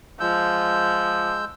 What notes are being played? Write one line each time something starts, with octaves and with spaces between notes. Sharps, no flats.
F3 G#3 E6 G6